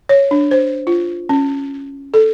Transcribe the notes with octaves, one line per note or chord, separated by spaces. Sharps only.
C#5
D4
C5
F4
C#4
A4